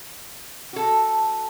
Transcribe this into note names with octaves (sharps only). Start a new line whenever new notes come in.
F#4 A4